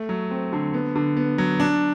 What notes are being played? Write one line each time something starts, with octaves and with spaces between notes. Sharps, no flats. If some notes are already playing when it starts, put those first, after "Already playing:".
Already playing: A3
F#3
C4
D3
B3
D3
B3
F#3
D4